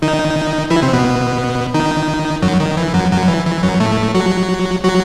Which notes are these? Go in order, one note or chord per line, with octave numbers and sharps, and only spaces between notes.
D#3 D#4
E3 E4
C3 C4
B2 B3
D#3 D#4
F#2 F#3
D#3
E3
F#2 F#3
F#2 F#3
E3
E3
F#2 F#3
A2 A3
F#3 F#4
F#3 F#4